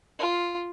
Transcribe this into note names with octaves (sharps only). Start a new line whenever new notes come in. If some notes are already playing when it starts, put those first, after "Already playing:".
F4